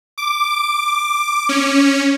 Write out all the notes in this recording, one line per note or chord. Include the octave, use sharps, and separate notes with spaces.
D6
C#4